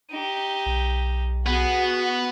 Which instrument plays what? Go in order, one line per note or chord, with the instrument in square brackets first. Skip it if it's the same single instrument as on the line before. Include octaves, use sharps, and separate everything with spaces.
[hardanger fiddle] D#4 G4
[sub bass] B1
[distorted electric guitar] B3 [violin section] F#4 [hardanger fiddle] G#4